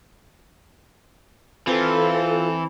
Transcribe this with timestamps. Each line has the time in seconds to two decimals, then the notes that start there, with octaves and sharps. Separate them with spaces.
1.67 E3 C4 F4 A4